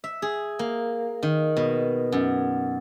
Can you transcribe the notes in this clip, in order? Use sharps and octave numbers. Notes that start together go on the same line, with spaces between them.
E5
G#4
A#3
D#3
B2
F#2